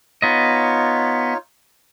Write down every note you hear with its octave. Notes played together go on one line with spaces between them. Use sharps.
B3 D#4 F4 C#5 D#5